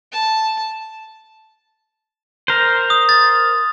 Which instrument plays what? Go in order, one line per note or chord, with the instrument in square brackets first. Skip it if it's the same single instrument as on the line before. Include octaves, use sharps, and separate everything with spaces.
[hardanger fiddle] A5
[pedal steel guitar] A#4 C5
[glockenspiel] D#6
A6